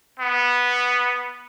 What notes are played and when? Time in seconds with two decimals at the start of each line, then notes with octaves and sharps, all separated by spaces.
0.20 B3